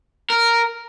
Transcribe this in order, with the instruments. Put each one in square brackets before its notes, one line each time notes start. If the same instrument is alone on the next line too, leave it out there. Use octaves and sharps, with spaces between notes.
[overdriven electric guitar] A#4